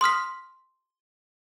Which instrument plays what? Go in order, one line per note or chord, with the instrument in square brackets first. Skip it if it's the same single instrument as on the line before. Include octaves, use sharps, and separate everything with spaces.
[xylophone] C6 D#6 F6 B6